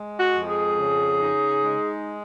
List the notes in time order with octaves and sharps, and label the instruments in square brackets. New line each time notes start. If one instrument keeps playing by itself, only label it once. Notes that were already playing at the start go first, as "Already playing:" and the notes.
Already playing: [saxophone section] G#3
F#4
F2
G#4
C#3
D#4
G#3